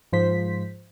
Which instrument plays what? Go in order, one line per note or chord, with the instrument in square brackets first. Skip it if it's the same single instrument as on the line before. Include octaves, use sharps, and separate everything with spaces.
[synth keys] G#2 F3 C5 B6